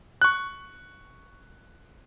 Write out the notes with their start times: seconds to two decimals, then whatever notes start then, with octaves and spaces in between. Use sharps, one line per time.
0.22 C#6 F#6